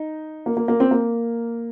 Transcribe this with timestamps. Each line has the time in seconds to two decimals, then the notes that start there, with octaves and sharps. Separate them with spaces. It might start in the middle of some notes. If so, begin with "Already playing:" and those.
Already playing: D#4
0.46 A#3
0.57 A#3
0.68 A#3
0.80 C4
0.91 A#3